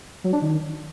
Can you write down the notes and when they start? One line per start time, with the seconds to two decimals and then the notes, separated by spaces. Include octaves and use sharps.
0.24 F#3
0.33 D4
0.42 D#3